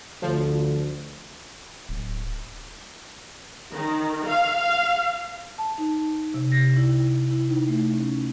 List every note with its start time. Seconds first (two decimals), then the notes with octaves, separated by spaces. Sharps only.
0.22 D2 F3
1.89 D1
3.71 D#3
4.25 F5
4.58 F5
5.58 A5
5.78 D#4
6.34 C3
6.52 A#6
6.77 E4
7.30 E4
7.48 D#4
7.68 A3
7.94 C#4